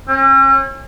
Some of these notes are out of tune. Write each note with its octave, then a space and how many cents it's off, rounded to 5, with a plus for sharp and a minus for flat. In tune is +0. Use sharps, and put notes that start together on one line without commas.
C#4 -40